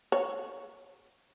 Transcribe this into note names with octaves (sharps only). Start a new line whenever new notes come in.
C#5